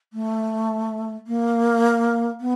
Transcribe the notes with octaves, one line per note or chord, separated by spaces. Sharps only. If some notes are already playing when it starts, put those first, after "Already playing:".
A3
A#3
B3